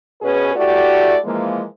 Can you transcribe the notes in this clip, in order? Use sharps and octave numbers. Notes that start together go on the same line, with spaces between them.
B2 C#4 G#4 B4
A3 E4 F#4 G4 D5
E3 F3 G#3 A#3